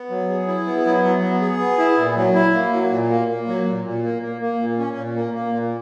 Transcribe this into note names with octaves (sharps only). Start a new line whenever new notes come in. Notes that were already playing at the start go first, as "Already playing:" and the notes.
Already playing: B3
F#3
G#4
E4
B3
F#3
F#3
B3
G#4
B3
E4
A#2
F#3
E4
A#3
F#3
A#2
A#3
A#3
F#3
A#2
A#2
A#3
A#3
A#3
A#2
C#4
A#2
A#3
A#3
A#2